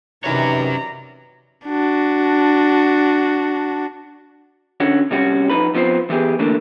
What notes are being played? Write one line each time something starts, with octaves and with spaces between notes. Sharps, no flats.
C3 D#3 E3 C#4 F#4 C#5 D5 A#5
D4 F#4
D3 C#4 F#4
C3 G3 C#4 F#4
F2 C#3 D#4 B4 B5
F3 B3 C4 A4 C5
E3 B3 G4 G#4
D3 E3 A3 A#3 D4